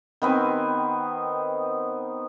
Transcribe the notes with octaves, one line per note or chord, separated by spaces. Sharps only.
D#3 B3 C4 G#5